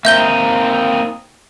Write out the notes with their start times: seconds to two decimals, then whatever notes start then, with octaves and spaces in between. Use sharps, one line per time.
0.05 A#3 C4 D#4 E5 G6 G7